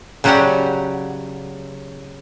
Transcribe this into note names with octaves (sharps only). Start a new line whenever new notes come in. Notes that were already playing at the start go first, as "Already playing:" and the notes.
C#3 F#3 F#4 G4 D5 F#5